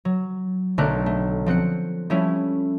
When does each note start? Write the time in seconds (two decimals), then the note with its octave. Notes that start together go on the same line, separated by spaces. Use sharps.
0.05 F#3
0.78 B1 D3 A3 A#4 D6 F#6
1.06 A3
1.46 F3 C4 F#6 C#7
2.10 F3 G3 A3 C#4 E4